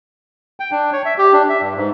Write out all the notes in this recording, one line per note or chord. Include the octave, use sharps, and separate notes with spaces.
G5
D4
C#5
E5
G4
D4
E5
G2
G#2